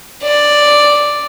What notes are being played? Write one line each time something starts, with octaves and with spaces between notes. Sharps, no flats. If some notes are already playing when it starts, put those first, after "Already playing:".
D5